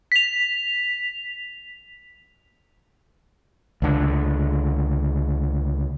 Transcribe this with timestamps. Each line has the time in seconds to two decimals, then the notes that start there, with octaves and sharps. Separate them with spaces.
0.12 B6 F7
3.82 C#2 D3